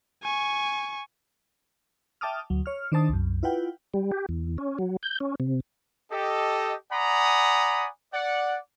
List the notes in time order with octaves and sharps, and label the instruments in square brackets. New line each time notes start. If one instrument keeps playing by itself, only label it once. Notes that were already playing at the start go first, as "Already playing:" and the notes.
[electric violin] G#5 C#6
[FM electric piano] E5 G5 A5 D6 D#6 F6
D2 F#3
C#5 F6
D#3 D4 C5 A5 D#6
C2 F#2
E4 F4 B4 F#5 G5
[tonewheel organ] G3
G4
E2
C#4
F#3
G6
C#4
C3
[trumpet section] G4 A4 D#5
D5 F#5 G#5 A#5 B5 D#6
D5 F#5